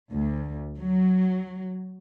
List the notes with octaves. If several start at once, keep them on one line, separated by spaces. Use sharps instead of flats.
D2
F#3